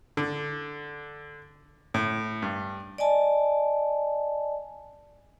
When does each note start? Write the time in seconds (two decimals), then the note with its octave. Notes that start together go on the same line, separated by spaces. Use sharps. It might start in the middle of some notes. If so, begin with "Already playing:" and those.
0.17 D3
1.94 A2
2.42 G2
2.98 D5 D#5 G#5 A5